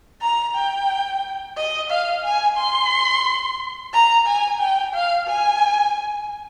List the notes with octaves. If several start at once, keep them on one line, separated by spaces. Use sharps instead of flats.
A#5
G5
D#5
F5
G#5
C6
A#5
G#5
G5
F5
G#5